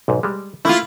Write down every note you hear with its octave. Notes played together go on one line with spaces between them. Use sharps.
B1 G#2
G3 G#3
A3 A#3 E4 F4